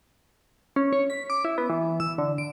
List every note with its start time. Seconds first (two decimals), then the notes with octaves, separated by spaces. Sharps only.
0.76 C#4
0.93 C#5
1.10 B6
1.30 D6
1.45 E4
1.58 B3
1.70 E3
2.00 E6
2.18 D3
2.38 D7